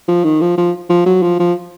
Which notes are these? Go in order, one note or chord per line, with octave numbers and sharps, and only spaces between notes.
F3
D#3
F3
F3
F3
F#3
F3
F3